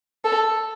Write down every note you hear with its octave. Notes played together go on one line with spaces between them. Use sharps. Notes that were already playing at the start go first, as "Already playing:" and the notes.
A4